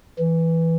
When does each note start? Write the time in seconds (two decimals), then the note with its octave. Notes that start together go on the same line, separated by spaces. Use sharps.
0.19 E3